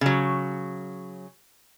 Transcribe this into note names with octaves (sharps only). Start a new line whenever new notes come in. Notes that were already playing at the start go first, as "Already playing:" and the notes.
C#3 F#3